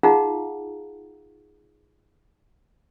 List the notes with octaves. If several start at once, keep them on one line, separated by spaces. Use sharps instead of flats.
D#4 F4 G#4 F5 F#5 A#5